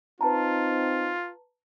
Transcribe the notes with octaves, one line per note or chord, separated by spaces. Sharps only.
C4 D#4 F4 B4 A5 A#5